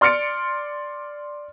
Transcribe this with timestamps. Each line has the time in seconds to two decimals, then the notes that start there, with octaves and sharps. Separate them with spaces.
0.01 D5 C6 F6 A6 C#7 D7